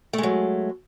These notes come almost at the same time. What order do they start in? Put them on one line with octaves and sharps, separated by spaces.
A3 G#3 F#3